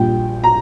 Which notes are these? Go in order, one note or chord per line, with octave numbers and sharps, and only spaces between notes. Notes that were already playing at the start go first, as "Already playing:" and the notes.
Already playing: A#1 A#2 G3 G5
A#5